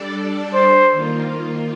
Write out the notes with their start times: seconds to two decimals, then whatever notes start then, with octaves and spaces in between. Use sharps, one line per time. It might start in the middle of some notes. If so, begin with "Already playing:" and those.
Already playing: G3 D4 A4 D5
0.54 C5
0.92 D#3 A#3 F4